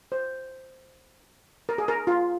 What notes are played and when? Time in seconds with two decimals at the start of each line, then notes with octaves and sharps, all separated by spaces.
0.12 C5
1.69 A#4
1.78 G#4
1.88 A#4
2.07 F4